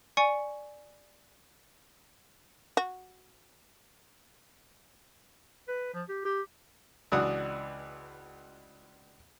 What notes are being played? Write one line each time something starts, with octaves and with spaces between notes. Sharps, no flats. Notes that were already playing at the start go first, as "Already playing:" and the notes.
D5 G#5 C#6 C#7
F#4
B4
F3
G4
G4
C#2 E3 D4 F#4 F#5 D#6